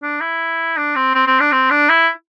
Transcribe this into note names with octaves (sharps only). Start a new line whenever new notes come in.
D4
E4
D4
C4
C4
C4
D4
C4
D4
E4